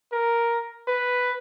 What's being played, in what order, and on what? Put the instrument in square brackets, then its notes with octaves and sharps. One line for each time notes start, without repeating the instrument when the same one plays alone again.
[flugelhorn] A#4
B4